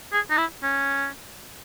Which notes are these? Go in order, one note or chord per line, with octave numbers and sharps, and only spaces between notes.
G#4
D#4
E4
C#4